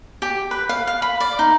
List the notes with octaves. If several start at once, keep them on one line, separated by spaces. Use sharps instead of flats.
G4
B4
F5
F5
B5
D5
D#4